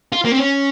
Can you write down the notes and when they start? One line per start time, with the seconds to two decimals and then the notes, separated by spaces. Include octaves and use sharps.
0.12 F4
0.25 A#3
0.32 C4
0.39 C#4